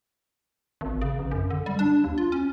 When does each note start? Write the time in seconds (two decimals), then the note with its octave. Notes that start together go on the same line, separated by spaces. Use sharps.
0.81 G#1
1.01 C#3
1.19 A1
1.31 F#2
1.50 D3
1.66 G3
1.79 D4
2.04 D#2
2.18 F4
2.32 C#4